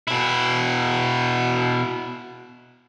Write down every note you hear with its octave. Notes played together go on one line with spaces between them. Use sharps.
B2 E4